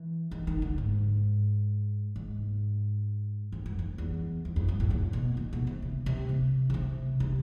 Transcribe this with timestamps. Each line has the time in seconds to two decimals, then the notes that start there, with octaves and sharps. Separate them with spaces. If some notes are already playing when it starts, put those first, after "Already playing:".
Already playing: E3
0.31 D#3
0.47 D#3
0.62 D3
0.78 G#2
2.16 G#2
3.52 F2
3.66 F#2
3.79 F2
3.98 E2
4.45 F2
4.56 F2
4.68 G2
4.80 A2
4.90 A#2
5.13 B2
5.37 A#2
5.53 B2
5.67 C3
5.82 C#3
6.06 C3
6.29 C3
6.70 C#3
6.74 C3
7.20 C3